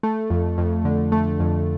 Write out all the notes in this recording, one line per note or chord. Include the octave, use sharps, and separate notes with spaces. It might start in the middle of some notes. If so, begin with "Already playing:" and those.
A3
F2
F2
D3
A3
F2